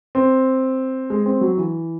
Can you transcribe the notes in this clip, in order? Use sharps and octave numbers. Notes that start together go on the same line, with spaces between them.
C4
G#3
C4
F#3
E3